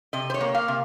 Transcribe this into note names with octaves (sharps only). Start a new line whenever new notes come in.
C3 D#5
C5
C#5
A#3
F5
C3